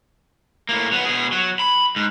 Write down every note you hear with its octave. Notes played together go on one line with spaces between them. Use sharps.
A2 A#3
F#3 B3
B2 G#4
F#3
B5
G#2